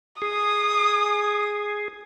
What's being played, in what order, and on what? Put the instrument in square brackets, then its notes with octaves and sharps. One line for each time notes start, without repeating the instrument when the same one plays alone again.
[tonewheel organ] G#4 [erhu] D#6